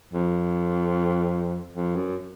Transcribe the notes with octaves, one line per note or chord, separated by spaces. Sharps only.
F2
F2
F#2